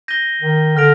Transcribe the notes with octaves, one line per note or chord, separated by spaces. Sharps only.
G6 A#6 D#7 G7
D#3
D3 F6 A#6 D7 F7